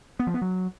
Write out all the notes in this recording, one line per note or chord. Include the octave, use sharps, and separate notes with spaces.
B3
F3
B3
F#3